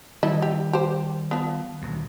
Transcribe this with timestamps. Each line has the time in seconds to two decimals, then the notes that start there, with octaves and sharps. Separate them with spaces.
0.23 D#3 G3 E4 D#5
0.42 G4
0.73 G4 C5
1.31 F3 B3
1.82 D#1 D2